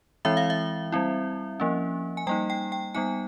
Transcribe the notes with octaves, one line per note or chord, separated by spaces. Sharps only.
E3 G#3 C4 E4 E5
F5
E5
G3 C4 E4
F3 A#3 C#4
G#5
G3 A#3 D#4 G5
G5
G5
G3 B3 D#4 G#5